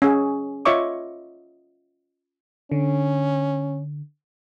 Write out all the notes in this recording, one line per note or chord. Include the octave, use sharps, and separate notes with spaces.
C#4 G#4
F4 C#5 D#5 E5 C#6 D6
D3 C#4